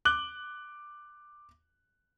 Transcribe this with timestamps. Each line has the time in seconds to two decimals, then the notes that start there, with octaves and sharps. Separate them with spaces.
0.05 D6 F#6 F#7 G7